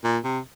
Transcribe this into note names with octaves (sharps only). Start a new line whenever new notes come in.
A#2
C3